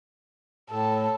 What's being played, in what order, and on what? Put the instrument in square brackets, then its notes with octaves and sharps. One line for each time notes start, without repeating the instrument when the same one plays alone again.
[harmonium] A2 [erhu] A4